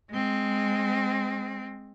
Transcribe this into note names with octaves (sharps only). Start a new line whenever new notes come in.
G#3 C4